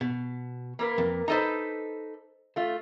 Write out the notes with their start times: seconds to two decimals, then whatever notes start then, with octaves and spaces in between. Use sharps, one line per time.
0.01 B2
0.79 A#3 A#4 B4
0.98 F2
1.28 D#4 A4 B4 C5 D#5 A#5
2.56 A3 F4